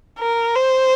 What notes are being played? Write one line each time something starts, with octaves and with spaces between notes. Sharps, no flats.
A#4
C5